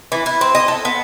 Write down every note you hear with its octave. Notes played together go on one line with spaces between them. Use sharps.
E3
E4
C4
D#5
A4
B3